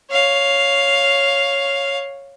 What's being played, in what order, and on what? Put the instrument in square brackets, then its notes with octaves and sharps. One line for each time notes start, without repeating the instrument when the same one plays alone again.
[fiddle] C#5 F5